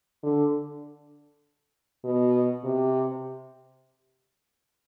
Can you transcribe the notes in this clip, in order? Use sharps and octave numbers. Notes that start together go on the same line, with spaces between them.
D3
B2
C3